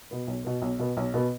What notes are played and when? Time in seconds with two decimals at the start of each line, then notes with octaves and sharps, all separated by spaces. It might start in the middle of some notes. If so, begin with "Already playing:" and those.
0.11 B2 B3
0.28 B1
0.44 B2 B3
0.62 B1
0.79 B2 B3
0.97 B1
1.14 B2 B3